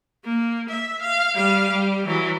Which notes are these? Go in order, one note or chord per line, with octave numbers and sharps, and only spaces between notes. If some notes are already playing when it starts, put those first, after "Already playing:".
A#3
E5
F5
G3 F5
G3
E3 F#3